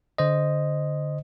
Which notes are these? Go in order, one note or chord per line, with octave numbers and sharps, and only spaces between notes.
D3 C5 D#5